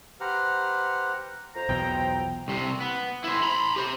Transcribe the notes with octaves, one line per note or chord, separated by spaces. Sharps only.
G4 B4 C5 F#5 A#5 F6
F2 C5 A#5
B1 E2 B2 G5
C2 C3
B3
E4 C5
A#5 B5
G4 C5